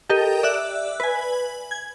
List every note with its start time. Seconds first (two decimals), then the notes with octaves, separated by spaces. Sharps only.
0.09 G4 A4 A#4 D#5 G5
0.43 D5 E5 E6 F#6
1.00 B4 G#5
1.71 G#6